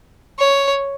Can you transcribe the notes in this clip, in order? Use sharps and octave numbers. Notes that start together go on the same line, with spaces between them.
C#5